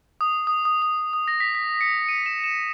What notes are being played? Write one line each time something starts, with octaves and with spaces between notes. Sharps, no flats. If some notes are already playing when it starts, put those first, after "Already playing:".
D#6
D#6
D#6
D#6
D#6
A#6
B6
B6
C#7
D#7
E7
E7